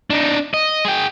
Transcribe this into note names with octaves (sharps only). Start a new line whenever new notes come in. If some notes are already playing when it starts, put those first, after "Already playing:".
D4 D#4
D#5
G#4 G5